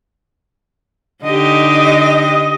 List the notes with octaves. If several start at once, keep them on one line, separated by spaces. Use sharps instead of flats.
D3 D#4 G4 D#5